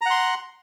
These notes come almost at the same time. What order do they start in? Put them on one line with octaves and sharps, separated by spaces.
A#5 F#5 C6